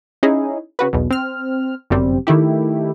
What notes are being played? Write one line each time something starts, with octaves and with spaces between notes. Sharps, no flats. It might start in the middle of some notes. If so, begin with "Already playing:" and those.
C#4 D#4 E4 G#4
C#3 F#4 B4
B1 E2 B2
C4 F6
G1 F#2 C3 G3 C4
D#3 A3 E4 G4